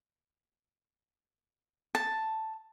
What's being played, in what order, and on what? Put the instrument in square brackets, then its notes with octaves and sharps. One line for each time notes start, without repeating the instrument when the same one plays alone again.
[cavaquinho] A5